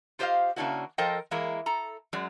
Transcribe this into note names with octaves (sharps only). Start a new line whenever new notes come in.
F4 G4 C5 D5 D#5 F5
C#3 A#3 C#4 D4 E4 F#4
F3 A4 A#4 C5 D#5 G5
E3 G#3 A#3 E4 A#4
A4 A#5
F#2 F#3 G#3 D5